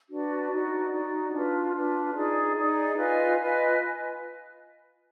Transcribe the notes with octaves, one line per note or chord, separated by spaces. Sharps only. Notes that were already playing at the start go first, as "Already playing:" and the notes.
D4 F#4 B4 D5
D#4 F#4 D5
D#4 F#4 D5
D4 F4 B4
D4 F4 B4
D#4 G#4 D5
D#4 G#4 D5
F4 B4 D#5 G#5
F4 B4 D#5 G#5